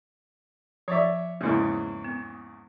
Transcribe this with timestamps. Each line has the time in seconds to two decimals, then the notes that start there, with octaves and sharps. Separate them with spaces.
0.88 F3 C#5 D5 E5
1.41 E2 G#2 C#3 A#3 E4
2.04 B3